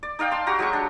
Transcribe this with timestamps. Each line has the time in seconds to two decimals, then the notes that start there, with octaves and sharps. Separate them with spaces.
0.03 D5
0.19 D#4 D5 F5 G5
0.31 A5 C6
0.46 F#4 G4 A#5
0.59 F#3 G#3 G4 C#6
0.73 D4